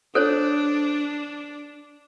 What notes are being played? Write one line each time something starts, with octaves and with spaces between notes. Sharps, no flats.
D4 A4 C5 C#5